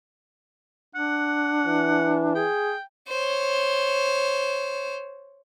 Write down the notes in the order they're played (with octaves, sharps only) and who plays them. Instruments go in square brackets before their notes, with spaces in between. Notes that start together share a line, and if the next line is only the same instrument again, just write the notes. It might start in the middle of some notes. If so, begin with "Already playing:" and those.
[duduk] D4 [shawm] F#5
[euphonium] E3
[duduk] G#4 [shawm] G5
[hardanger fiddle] C5 C#5